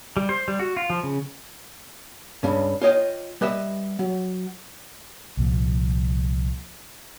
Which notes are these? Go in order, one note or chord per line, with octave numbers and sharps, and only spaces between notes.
G3
C5
G3
F#4
F4
F3
C#3
C#2 G2 C#3
F4 C#5 D#5 G5
G3 B4 D#5 E5
F#3
C2 A#2 F3